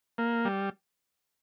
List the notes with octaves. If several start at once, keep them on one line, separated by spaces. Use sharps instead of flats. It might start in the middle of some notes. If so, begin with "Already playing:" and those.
A#3
G3